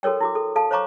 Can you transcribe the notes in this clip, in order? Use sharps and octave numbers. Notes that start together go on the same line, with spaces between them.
F#4 A4 A#4 C#5 G5
E4 F#4 D6
A4
A4 F5 A5
C5 C#5 F5 A#5 C#6 D6